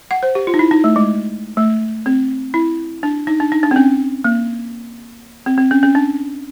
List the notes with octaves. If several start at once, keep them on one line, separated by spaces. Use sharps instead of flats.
F#5
C5
G4
F4
D#4
E4
D#4
A3
G#3
A3
C4
E4
D4
D#4
D4
D#4
D4
C4
C#4
A#3
C4
C4
C#4
C#4
D4